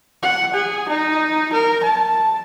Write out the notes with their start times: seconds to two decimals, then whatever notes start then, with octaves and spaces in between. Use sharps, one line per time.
0.23 F#5
0.53 G#4
0.89 D#4
1.53 A#4
1.83 A5